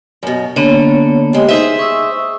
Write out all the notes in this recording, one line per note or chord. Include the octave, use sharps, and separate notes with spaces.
F#2 B2
D3 A#3 B3 C#5
G3 G#3
D#4 G#4 C5 D#5 E5
C#6 D#6 E6